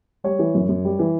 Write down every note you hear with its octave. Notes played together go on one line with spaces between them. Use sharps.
G3 C#5
E3
F#2
F#2
G3
E3